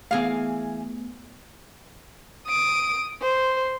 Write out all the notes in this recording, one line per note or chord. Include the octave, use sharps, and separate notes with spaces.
E3 A3 B3 G#4 F5
D#6 D7
C5